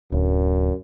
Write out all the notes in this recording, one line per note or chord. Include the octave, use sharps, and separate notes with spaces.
D1 F#2